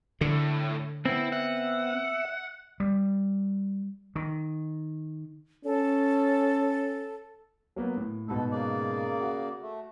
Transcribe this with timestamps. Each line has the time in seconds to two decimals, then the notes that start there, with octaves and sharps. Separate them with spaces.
0.21 A2 D3
1.06 B3 C4 E4
1.32 E5 F#5
2.80 G3
4.16 D#3
5.65 C#4 A4
7.76 F#3 A#3 B3
7.97 A2
8.28 G#2 B2 B3 A4
8.51 C#3 A#3 D5
9.21 F#4
9.62 A3